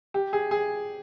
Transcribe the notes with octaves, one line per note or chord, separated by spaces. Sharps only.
G4
G#4
G#4